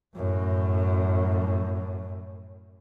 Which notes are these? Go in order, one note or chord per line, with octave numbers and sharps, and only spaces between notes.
F#2 A2